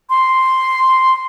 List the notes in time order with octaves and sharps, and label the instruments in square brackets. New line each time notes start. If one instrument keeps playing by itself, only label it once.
[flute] C6